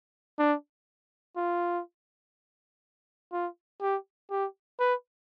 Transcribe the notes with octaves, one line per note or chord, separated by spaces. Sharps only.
D4
F4
F4
G4
G4
B4